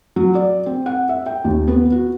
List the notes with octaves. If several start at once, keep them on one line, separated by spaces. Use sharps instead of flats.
F#3
D5
C4
F#5
E5
G5
D#2
B3
F#4